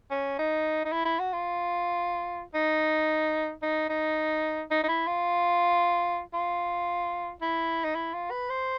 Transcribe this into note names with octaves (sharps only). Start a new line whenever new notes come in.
C#4
D#4
D#4
E4
E4
F#4
F4
D#4
D#4
D#4
D#4
D#4
E4
F4
F4
E4
D#4
E4
F4
B4
C5